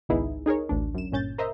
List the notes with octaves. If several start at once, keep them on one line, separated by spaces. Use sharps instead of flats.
G#1 C#2 B3 D#4 E4 G#4
D#4 G#4 A#4 C#5
A1 D2 D4
F#2 E7
G1 A#2 C#4 G6 A6
A#4 C5 D#5 E5 A#5